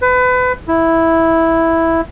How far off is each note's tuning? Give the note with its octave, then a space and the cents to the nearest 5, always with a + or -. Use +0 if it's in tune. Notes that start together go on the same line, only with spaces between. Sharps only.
B4 +30
E4 -5